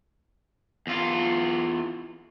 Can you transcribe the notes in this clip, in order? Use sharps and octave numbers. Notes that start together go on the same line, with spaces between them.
E2 F4